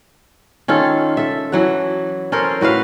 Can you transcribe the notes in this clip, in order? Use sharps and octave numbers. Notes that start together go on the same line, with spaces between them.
D#3 C#4 F4 A4
A4 E5
E3 F#3 F#5
C#4 A4 A#4 C5
A2 F#4 B4 F5